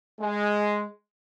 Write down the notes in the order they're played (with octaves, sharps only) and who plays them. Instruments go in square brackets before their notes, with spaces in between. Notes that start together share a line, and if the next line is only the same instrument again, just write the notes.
[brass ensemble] G#3